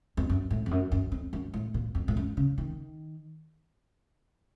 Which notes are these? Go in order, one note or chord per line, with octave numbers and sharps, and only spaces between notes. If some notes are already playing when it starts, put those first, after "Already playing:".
F2
F#2
A2
F2
F#2
F#2
F2
F#2
A2
A#2
F2
A2
F#2
C#3
D#3